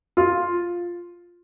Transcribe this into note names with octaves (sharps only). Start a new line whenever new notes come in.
F4